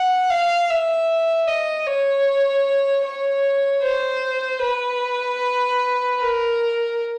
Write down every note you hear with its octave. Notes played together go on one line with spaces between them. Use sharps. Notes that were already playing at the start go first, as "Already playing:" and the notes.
Already playing: F#5
F5
E5
D#5
C#5
C#5
C5
B4
A#4